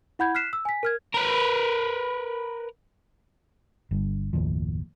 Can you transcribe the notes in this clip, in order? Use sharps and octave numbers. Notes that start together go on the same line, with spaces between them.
E4 F#5 B5 G6 G#6
F6 F#6 B6 C7 E7
E6
G#5 B6
A#4 F6 G#6
A#4 B4
G1 G2
F#1 D#2 A2 F3